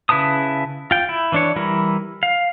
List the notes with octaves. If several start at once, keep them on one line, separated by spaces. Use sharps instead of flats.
C#3 E4 B4 A5 D#6
F4 G5
E4
E3 D4 C#5
E3 G3 E4 A#4
F5